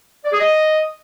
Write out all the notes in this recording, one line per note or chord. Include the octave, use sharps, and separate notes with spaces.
D5
G#4
D#5